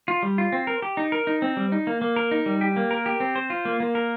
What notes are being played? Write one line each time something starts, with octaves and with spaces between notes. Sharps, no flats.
F4
G3
F4
C4
A#4
G4
D#4
A#4
D#4
C4
G3
D#4
A#3
A#3
A#4
D#4
G3
G4
A#3
A#4
G4
C4
C5
F4
A#3
A#3
A#4